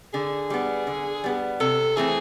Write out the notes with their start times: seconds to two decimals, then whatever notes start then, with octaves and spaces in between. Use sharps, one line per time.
0.13 D3 G#4
0.50 G3 B3
0.87 D3
1.24 G3 B3
1.60 C3 A4
1.96 E3 A3 C4 G#4